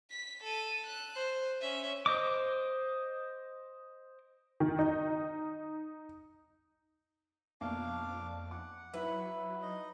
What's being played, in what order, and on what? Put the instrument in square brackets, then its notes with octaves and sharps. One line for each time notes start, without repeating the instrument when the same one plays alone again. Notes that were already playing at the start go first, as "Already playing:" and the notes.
[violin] B6
A4 D#7
F#6
C5
C#4 E5
[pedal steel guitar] C5 D#5 D6
[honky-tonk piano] D#3
D#4
[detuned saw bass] F2 [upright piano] B2 A#3 [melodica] D4 F5 D6
[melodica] F#5 [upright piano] D6
[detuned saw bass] F#3 [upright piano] E4 E5 [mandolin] B4
[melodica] D#4 D#5